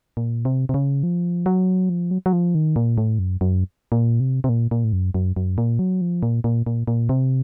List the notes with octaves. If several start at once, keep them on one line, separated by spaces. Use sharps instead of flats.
A#2
C3
C3
C#3
F3
F#3
F3
F#3
F#3
F3
D#3
A#2
A2
F#2
F#2
A#2
C3
C3
A#2
A#2
A2
F#2
F#2
F#2
A#2
F#3
F3
A#2
A#2
A#2
A#2
C3